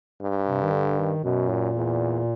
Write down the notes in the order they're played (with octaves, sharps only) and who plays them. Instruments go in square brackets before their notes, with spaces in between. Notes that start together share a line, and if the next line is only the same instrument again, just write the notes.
[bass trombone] G2
[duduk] C3
D#3
D3
D#3
[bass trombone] F#2 [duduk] B2
[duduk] A#2
[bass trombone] E2